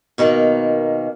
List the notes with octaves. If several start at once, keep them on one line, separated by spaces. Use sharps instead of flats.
B2 D#3 A#3